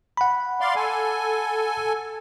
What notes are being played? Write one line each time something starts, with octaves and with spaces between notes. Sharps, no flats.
F#5 B5
D5 F5 C6
A4 G#5